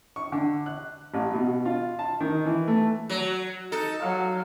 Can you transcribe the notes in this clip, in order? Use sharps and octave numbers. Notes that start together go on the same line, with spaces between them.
C#6
D3
F#6
A1
B2
F4
A5
D#3
E3
A3
F#3
D#4 A4
F#3 F5